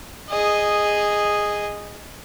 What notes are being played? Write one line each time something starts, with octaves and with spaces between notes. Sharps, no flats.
G#4 D#5